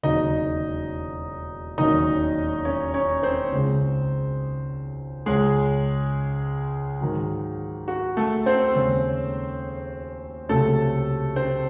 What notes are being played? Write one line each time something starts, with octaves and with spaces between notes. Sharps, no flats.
E1 D#2 C#3 F#3 D#4 D#5
E1 D#2 D#3 F#3 C#4 D#4 D#5
C#4 C#5
C#4 C#5
C4 C5
C#2 C#3 G#3 C4
C#2 C#3 G#3 C#4 G#4
G#2 D#3 F#3
F#4
A3 A4
C4 C5
D#2 C#3 G#3 C#4
C#2 C3 F#3 A3 C#4 A4
C4 C5